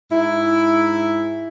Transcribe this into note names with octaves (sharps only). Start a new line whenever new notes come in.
G#2 E4